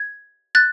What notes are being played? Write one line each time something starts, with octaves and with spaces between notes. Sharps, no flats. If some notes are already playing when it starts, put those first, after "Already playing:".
Already playing: G#6
F#6 A6